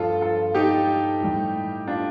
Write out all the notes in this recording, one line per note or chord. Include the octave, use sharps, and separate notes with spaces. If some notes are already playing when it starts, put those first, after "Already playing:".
Already playing: G2 F3 F4 A4
F4 A4
D#4 G4
A2 G3
D4 F4